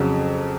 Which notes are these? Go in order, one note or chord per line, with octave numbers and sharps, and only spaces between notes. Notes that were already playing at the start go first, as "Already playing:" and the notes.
Already playing: F2 C#3 F#3